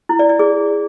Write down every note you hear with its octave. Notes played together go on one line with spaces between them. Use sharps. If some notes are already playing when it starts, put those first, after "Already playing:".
E4
D5
D5
G#4